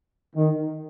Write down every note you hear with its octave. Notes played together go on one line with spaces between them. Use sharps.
D#3